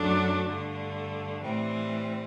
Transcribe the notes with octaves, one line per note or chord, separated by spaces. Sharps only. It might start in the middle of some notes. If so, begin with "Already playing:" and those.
Already playing: F#2 F#3 A3 D4
G2 D3 A3
A2 E3 G3 C4